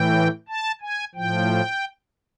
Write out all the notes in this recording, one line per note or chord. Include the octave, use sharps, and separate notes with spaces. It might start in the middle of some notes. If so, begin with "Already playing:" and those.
Already playing: A2 E3 G5
A5
G#5
A2 F3 G5